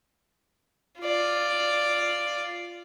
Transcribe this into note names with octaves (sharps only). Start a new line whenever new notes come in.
F4 D5